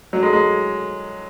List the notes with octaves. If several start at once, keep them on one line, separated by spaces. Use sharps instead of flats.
F#3
G#3
G#3